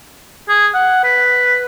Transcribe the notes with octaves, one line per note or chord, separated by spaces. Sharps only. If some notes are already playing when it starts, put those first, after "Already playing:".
G#4
F#5
B4